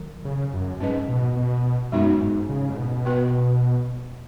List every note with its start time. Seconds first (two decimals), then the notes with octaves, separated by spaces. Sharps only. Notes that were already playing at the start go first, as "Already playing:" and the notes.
Already playing: D#3 F#3
0.25 C#3
0.54 F#2
0.80 G#2 C#4 B4 D#5
1.08 B2
1.37 B2
1.92 F#2 G#3 B3 D#4 F#4
2.21 G#2
2.49 C#3
2.69 G#2
2.77 B2
3.05 B3 F#4 B4